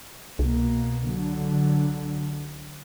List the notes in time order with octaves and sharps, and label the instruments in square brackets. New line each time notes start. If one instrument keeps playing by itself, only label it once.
[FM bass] C2 [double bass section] B2 A#3
[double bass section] D3 F#3